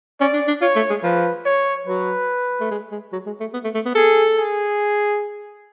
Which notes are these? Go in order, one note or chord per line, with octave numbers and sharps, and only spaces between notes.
C#4 D5
D4
D4
F4 C#5
A3
G#3
F3 B4
C#5
F#3 B4
A3
G#3
G#3
F#3
G#3
A3
B3
A3
A3
B3
G#4 A4
G#4